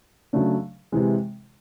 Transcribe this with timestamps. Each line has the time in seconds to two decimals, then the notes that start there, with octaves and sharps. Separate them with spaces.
0.33 C#3 F#3 A3 D4
0.92 C3 E3 G#3